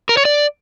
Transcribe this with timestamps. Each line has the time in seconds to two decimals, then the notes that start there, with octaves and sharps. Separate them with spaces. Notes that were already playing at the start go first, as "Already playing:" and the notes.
0.09 A#4
0.17 C#5
0.25 D5